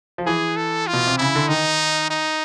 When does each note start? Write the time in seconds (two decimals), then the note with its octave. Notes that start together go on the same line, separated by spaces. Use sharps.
0.18 F3
0.26 E3 G#4
0.57 A4
0.87 F4
0.93 B2
1.07 C3
1.18 C#3 E4
1.35 D3
1.48 D#3 D#4
2.10 D#4